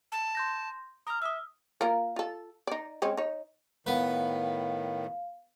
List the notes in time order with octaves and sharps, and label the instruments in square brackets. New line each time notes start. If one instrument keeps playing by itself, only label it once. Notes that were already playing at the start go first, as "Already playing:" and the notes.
[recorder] A5
[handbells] C6 G6 A#6
[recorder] A#5 [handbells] D#6 F6
[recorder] E5 [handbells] D#6 E6
[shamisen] A#3 F4 A#4
F4 A4
D#4 D5
G#3 C4 C#4
D#4 C#5
[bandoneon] A2 D#3 [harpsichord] B3 B4 [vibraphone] F5